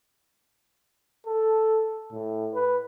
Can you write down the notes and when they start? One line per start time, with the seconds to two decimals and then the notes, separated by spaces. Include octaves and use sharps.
1.27 A4
2.12 A2
2.54 B4